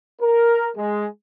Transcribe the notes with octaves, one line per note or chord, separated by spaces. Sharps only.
A#4
G#3